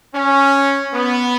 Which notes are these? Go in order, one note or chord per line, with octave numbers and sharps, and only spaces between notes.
C#4
B3